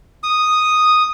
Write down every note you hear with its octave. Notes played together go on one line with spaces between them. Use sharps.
D#6